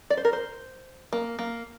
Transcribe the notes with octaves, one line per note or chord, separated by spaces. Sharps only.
D5
C5
A#4
C5
A#3
A#3